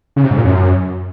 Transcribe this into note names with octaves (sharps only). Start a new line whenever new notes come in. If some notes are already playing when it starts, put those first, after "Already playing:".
C#3
C3
G#2
A#2
F#2